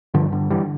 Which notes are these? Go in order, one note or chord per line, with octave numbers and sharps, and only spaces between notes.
G2 D3 F3
D3
D3 E3 G3